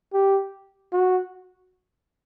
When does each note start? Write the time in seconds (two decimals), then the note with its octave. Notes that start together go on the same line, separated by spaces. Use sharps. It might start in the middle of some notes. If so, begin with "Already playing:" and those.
0.13 G4
0.93 F#4